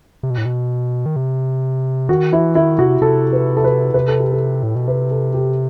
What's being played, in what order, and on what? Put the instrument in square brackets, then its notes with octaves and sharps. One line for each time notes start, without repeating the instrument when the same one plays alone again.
[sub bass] C3
B2
A2
B2
D#3
C3
[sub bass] D#3 [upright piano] F#4
[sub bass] E3 [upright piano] E4
[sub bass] D#3 [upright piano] E4
[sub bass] C3 [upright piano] F#4
[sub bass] C3 [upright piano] A4
[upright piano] B4
A4
B4
[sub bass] C3 [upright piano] B4
[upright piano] A4
G4
A4
[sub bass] A2
B2
[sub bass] C3 [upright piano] B4
[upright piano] A4
G4